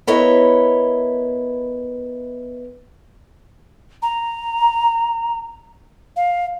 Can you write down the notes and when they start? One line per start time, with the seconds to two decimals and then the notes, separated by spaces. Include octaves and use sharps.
0.07 B3 E4 A#4 C#5 D#5 E5
4.02 A#5
6.16 F5